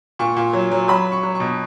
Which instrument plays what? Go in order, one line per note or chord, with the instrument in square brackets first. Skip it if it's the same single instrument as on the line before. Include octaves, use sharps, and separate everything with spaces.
[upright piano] A#2 C#6
A#2
F#3
F#3
F#3 B5
F#3
C#6
F#3
C#6
B2